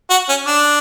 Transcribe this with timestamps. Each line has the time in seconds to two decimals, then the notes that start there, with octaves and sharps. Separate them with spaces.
0.10 F#4
0.29 C#4
0.46 D4